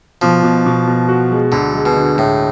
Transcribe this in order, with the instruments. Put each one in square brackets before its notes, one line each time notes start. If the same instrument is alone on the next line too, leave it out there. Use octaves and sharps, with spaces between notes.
[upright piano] B2 [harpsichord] F3
[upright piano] B2
B2
B2
F#4
G#3
[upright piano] D2 [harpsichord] D3
[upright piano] G#3
[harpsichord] B2
[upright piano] D3
[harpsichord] A2 [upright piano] G#3